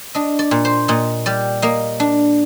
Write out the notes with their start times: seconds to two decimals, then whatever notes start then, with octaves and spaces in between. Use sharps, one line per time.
0.15 D4 D#5
0.39 D5
0.51 A#2
0.65 C5
0.88 A#2 D#5
1.26 G3 D5
1.62 A#3 D#5
2.00 D4